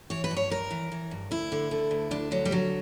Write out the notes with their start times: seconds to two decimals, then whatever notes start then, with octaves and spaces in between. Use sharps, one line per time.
0.10 E3 C#5
0.24 B4
0.31 G2
0.37 C#5
0.50 G2 A#4
0.70 E3
0.92 E3
1.11 G2
1.31 D2 E4
1.52 D3
1.71 D3
1.91 D2
2.11 D2 D4
2.31 D3 F#3
2.45 G3
2.51 D3 F#3